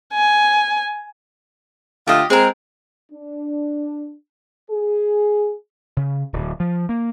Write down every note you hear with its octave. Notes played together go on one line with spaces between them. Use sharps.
G#5
D3 A3 F4 G4 D#5
G#3 C4 G#4 A#4
D4
G#4
C#3
D1
F3
A#3